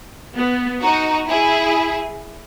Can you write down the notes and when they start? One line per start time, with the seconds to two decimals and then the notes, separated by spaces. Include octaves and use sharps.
0.36 B3
0.82 D#4 F#4
1.29 E4 G#4